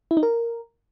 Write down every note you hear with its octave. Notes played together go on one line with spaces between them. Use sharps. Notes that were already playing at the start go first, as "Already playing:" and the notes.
E4
D#4
A#4